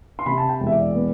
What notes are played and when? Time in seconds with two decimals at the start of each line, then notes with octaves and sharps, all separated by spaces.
0.19 C6
0.26 C3 B5
0.38 A5
0.49 G5
0.60 E1
0.67 E5
0.72 D5
0.94 B3